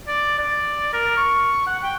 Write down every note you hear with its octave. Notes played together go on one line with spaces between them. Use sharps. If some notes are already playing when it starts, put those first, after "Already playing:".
D5
D5
A#4
C#6
F#5
G5